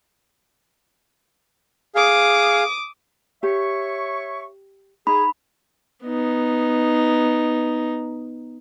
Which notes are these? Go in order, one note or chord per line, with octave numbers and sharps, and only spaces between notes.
G#4 F5 D6 D#6
G4 C#5 E5 C#6
D#4 G#4 B5
B3 D#4